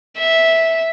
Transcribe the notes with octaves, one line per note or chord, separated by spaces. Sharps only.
E5